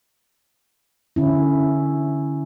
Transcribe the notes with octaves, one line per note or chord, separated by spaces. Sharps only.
D3 C#4 E4